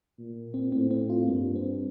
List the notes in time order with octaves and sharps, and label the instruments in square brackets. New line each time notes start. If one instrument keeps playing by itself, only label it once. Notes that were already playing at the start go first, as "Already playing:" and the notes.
[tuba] A#2
[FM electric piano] C4
[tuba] A2 [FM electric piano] C4
[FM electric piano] C4
F4
[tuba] G2 [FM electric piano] A#3
[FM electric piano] C4